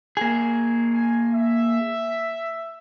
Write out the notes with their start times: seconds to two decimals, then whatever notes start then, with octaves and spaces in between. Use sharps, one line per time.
0.17 A#3 G#4
0.94 G#5
1.33 E5